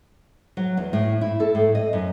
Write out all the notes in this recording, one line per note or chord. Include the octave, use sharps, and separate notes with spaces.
F#3
E2
A2
E4
A4
A2
D#5
F#2